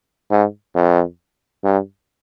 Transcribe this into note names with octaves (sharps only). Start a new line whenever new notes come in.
G#2
F2
G2